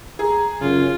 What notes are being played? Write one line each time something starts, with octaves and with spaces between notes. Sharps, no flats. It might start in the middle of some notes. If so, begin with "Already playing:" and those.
G#4 A#5
F#2 C#3 F4